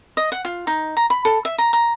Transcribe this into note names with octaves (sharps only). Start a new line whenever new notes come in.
D#5
F#5
F4
D#4
A#5
B5
A4
E5
A#5
A#5